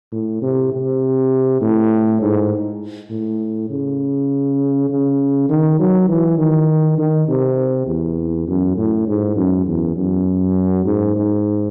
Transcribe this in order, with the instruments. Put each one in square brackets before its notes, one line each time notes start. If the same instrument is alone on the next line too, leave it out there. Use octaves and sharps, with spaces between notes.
[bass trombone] A2
C3
C3
A2
G#2
A2
C#3
C#3
D#3
F#3
E3
D#3
D#3
C3
E2
F#2
A2
G#2
F#2
E2
F#2
G#2
G#2